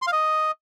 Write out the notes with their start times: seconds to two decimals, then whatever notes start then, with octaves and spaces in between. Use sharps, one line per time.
0.02 C6
0.07 F5
0.13 D#5